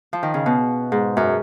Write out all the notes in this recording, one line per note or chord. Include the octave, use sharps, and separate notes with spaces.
F3
D#3
C#3
B2
G#2
F#2